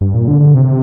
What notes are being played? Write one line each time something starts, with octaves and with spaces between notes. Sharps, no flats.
G2
A#2
D3
D3
C3